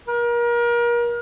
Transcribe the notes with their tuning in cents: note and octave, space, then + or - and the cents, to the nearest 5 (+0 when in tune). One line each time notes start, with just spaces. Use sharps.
A#4 +35